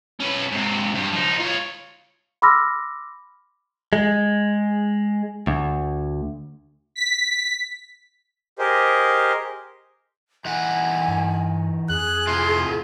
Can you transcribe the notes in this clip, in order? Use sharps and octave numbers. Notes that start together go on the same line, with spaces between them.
C#4 B4
G#2 C3
G2 G3
F3 D#4
F4 C#5
B5 C6 D6 E6 F6 A#6
G#3
D2
B6
G4 G#4 A#4 C5 D#5
E3 D#4 F#5 G#5
G2
F2 G#4 F#6
A2 C3 F4 C6